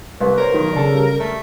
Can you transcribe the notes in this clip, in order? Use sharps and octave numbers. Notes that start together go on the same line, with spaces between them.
C2 B3 B4
A#4 C5 C#5
B1 D#3
C#3 D4 A4
G3
A3